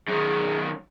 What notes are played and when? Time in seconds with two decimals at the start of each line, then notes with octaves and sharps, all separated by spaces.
0.08 F#2 D#3 G#4